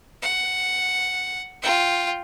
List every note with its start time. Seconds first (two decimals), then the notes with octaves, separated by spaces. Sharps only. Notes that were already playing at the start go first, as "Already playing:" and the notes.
0.22 F#5
1.63 F4 G5